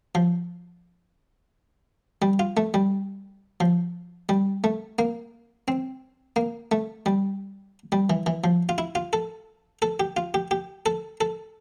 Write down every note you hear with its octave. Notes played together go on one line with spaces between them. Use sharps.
F3
G3
F4
A3
G3
F3
G3
A3
A#3
C4
A#3
A3
G3
G3
E3
E3
F3
F4
E4
F4
A4
A4
G4
F4
G4
G4
A4
A4